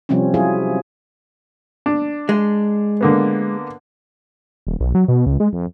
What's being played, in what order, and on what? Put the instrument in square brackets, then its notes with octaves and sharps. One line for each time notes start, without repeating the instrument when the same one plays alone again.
[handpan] C3 F3 G3 C4 C#4
F#3 E4 F4 G#4
[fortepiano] D4
[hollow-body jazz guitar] G#3
[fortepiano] D3 A#3 B3
[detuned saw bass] D#1
B1
F#3
B2
C#2
G#3
F2